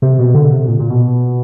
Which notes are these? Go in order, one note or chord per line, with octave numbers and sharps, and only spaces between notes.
C3
B2
D3
C3
A#2
A#2
B2